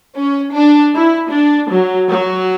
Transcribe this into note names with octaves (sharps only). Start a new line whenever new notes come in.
C#4
D4
E4
D4
F#3
F#3